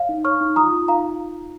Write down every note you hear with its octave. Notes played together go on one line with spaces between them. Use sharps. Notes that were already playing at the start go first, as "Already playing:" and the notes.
Already playing: C#5 F5
D#4
C#5 C#6 F6
D#4
F4 A#5 D#6
F4
D#4 F5 A#5